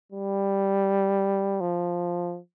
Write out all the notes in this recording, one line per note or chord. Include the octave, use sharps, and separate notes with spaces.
G3
F3